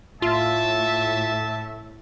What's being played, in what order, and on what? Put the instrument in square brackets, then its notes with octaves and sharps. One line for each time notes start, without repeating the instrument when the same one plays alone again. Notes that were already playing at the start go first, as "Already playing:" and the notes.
[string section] A2 [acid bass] F4 [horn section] E5 [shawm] A5